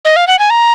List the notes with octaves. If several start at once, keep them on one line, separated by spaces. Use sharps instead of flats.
D#5
F5
F#5
G#5
A#5